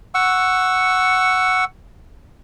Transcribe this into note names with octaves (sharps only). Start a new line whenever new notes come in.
F#5 C#6 E6